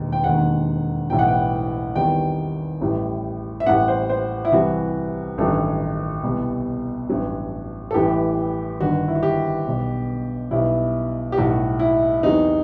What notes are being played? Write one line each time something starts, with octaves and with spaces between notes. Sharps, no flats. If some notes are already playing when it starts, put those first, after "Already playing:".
Already playing: E1 D#2 D#3
G5
E1 D#2 D#3 F#5
B1 A2 E3 G3 G5
F#5
G5
E2 C3 D#3 G3 G5
A1 A2 G3
E5
A1 A2 G3 F#5
C5
C5
E4
C2 C3 E3 G3 F#4
A1 G2 D#3 F#3 A4
C2 B2 G3
A1 G2 F#3
A4
A1 A2 E3 G3 G4
G1 G2 D#3 F#4
E4
F#4
G4
B1 B2 G3
B1 B2 G3 E4
G4
B1 A2 G3 F#4
E4
E2 C3 F#3 D#4